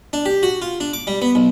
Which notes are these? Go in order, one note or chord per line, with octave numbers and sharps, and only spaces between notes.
D4
G4
F#4
F4
D4
D6
G3
B3
B1